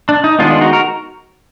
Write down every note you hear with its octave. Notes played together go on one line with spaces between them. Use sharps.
D4
D#4
D#3 G#3 B3 D4 F4
D4 F4
D#4 F#4
F#4 A#4